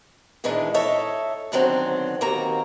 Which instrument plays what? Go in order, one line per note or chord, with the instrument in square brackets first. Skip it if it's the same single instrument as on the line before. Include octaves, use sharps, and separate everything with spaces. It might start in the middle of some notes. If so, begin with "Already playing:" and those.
[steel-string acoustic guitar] A#2 D#3 E3 G#3 D4
A4 C#5 D#5 E5
F#2 B2 D3 D#3 F#3 C4
D#2 A#3 C4 F#4 A#5